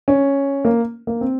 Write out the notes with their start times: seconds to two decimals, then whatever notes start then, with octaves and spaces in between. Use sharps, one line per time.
0.08 C#4
0.65 A#3
1.07 A#3
1.21 C4